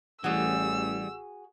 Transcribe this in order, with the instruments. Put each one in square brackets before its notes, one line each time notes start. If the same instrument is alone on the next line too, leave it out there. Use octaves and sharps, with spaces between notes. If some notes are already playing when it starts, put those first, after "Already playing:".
[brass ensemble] A1 [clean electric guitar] E3 G3 [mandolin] F#4 G#4 [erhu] E6